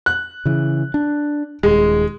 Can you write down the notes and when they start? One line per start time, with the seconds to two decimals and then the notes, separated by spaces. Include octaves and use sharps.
0.06 F#6
0.45 C#3 E3
0.94 D4
1.63 D#1 G#3